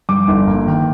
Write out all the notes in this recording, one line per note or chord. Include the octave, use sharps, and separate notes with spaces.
G2 D6
G1
A#3
D#3